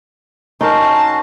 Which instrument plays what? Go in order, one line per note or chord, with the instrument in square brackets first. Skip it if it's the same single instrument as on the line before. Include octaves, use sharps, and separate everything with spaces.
[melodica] C#4 F#4 C5 [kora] D#4 A#4 [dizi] A5